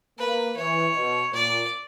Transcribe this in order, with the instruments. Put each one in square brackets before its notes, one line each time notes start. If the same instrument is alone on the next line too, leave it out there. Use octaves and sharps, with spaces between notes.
[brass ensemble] A#3 [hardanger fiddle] B4
[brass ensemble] E3 [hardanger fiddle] C#5
[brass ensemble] B2
[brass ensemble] A#2 [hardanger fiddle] D5